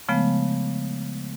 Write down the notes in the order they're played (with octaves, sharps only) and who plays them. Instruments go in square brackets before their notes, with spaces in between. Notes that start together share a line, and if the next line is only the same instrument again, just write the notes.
[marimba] C#3 F3 G#3 A3 B3